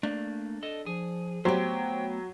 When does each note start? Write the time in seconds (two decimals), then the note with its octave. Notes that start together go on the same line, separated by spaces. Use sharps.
0.03 A3 A#3 D4
0.63 A4 D#5
0.86 F3 G#4
1.45 F#3 A3 B3 G4 C5 G5